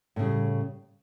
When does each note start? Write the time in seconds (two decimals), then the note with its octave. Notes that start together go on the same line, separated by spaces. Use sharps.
0.16 A2
0.19 C#3
0.22 G3